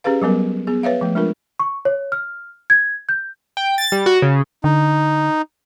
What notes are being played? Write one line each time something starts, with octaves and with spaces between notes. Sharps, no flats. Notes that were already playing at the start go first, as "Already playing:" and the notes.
C#4 G4 G#4 B4 F5
F#3 G3 B3 A#4
B3 G#4
B4 C#5 E5 F5
F3 A3
G#3 D4 F4 A#4
C#6
C#5
F6
G#6
G6
G5
A6
G3
F#4
C#3
D3 D#4